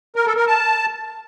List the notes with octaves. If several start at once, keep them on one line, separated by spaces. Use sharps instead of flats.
A#4
A4
A#4
A5